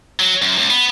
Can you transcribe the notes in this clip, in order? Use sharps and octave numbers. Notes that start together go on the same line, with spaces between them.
F#3
F#2
C#2
B3